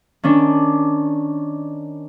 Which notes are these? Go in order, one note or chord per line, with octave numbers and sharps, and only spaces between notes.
D#3 C#4 D4